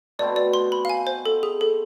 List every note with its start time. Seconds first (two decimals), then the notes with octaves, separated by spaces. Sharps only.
0.19 B2 A3 C4 E4 D5
0.36 D5
0.54 C6
0.72 B5
0.85 F5
0.89 G#5
1.07 C5
1.26 A4
1.43 G#4
1.61 A4